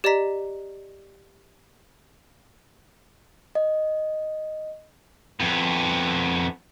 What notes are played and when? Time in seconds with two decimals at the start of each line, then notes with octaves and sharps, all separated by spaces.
0.04 G4 D5 D#5 A#5 B6
3.55 D#5
5.40 F2 B3